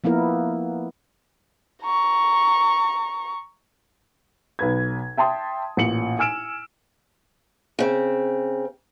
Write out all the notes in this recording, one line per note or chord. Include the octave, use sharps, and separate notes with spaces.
F3 A#3 B3 E4 A#4
A#5 C#6
B1 B4 G#6
E5 G5 A5 C6 D#6
A1 A#2 C#7 F#7
G#5 E6 F6 D7 E7
C#3 C4